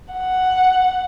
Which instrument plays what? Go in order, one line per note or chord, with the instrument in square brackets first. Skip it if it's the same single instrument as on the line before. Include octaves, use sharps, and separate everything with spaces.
[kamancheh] F#5